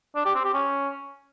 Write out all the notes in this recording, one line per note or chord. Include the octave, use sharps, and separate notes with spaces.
D4
G4
C4
G4
C#4